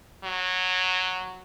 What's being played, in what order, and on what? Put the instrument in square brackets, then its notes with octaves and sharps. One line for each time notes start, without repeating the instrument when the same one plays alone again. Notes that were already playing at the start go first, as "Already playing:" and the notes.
[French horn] F#3